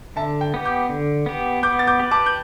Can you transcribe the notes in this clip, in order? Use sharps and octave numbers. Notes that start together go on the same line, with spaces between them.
D3 E5 A5
G5
B3 G4
D6 G6
D3
B3 G4
B3 D6 G6
A6
D6 G6
G4 B4
A5 D6
G6